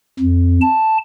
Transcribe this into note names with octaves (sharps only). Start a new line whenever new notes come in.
F2
A5